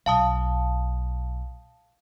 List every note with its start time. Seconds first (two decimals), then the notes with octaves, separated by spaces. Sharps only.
0.06 B1 F5 A5 D#6